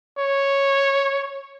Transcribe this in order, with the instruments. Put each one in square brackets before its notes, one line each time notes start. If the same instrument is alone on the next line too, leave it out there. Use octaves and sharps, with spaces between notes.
[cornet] C#5